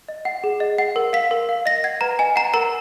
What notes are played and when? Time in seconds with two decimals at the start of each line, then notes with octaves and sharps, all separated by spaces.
0.09 D#5
0.25 F#5
0.44 G#4
0.60 D#5
0.78 F#5
0.96 A#4
1.13 F5 B6
1.31 A#4
1.49 F5
1.66 D#5 A#6
1.84 F#5 G#6
2.01 B4 A#5
2.19 D#5 G#5
2.36 F#5 A#5
2.54 A#4 A#5